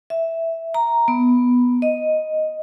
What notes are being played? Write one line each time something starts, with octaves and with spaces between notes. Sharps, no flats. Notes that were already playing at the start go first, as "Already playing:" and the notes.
E5
A#5
B3
D#5